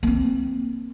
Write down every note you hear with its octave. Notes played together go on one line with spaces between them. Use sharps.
A#3 C4